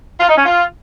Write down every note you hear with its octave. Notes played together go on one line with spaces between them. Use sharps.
F4
D#4
C#4
F4